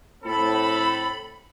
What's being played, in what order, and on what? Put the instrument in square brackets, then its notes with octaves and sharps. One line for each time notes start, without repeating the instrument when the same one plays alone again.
[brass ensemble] A2 C4 A4 [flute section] B5